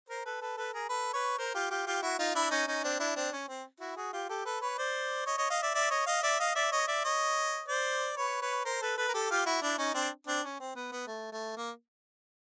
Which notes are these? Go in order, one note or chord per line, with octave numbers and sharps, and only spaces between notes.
A#4 C5
A4 B4
A4 B4
A4 B4
G#4 A#4
A4 B4
B4 C#5
A#4 C5
F4 G4
F4 G4
F4 G4
E4 F#4
D#4 F4
D4 E4
C#4 D#4
C#4 D#4
C4 D4
D4 E4
C4 D4
C#4
C4
E4 F#4
F#4 G#4
F4 G4
G4 A4
A4 B4
B4 C#5
C5 D5
C#5 D#5
C#5 D#5
D#5 F5
D5 E5
D5 E5
C#5 D#5
D#5 F5
D5 E5
D#5 F5
D5 E5
C#5 D#5
D5 E5
C#5 D#5
C5 D5
B4 C#5
B4 C#5
A#4 C5
A4 B4
A4 B4
A#4
G4 A4
F4 G4
E4 F#4
D4 E4
C#4 D#4
C4 D4
C4 D4
C#4
C4
B3
B3
A3
A3
A#3